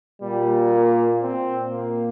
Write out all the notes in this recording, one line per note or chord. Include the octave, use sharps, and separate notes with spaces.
A#2 G3
A#3
A#2 C4
A#3